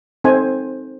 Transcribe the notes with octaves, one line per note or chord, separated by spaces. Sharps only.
C4 D#4 A4 C5 G#5